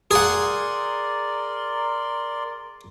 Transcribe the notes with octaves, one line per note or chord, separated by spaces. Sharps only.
G#4 A#4 D5 F#5 C6